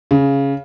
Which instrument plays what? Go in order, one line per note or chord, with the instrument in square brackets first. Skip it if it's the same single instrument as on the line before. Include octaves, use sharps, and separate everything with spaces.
[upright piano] C#3